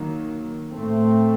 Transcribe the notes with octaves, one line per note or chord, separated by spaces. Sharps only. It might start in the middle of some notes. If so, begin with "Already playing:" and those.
Already playing: D#3 F#3 A#3
A2 A3 C4